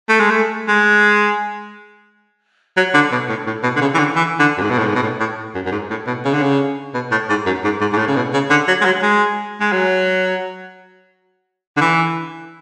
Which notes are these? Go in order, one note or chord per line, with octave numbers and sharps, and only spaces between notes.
A3
G#3
A3
G#3
F#3
D3
B2
A2
A2
B2
D3
C#3
E3
D3
E3
D3
F#2
G#2
B2
A2
G#2
B2
A2
A2
F#2
F#2
G#2
A2
B2
C#3
D3
C#3
B2
A2
G#2
F#2
G#2
G#2
G#2
A2
C#3
B2
C#3
D3
F#3
G#3
F#3
G#3
G#3
F#3
D3
E3